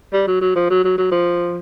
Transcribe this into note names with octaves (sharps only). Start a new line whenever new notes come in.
G3
F#3
F#3
F3
F#3
F#3
F#3
F3